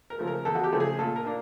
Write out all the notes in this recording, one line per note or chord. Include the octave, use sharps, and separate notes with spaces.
A#4
C#3 F3 A3
A#4
E2 A4
F#4
G4
C#3 F3 A3
G#4
A#2 A4
A#4
A#3 D4